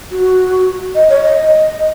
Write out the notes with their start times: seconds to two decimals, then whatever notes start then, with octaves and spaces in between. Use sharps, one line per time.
0.11 F#4
0.95 D#5
1.09 C#5
1.23 D#5
1.37 D#5